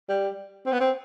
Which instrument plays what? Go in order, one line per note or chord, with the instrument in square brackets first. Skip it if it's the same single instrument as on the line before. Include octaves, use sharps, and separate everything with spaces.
[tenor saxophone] G3
C4
B3
C4